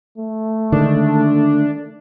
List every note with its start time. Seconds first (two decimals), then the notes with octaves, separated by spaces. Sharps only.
0.18 A3
0.72 D3 D#3 G#3 D4